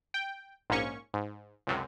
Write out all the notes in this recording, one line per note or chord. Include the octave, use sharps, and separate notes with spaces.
G5
A#1 G#2 A#3 C#4 C#6
G#2
C#2 F#2 C3